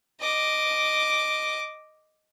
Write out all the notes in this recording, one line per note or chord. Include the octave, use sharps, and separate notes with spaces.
D#5 D6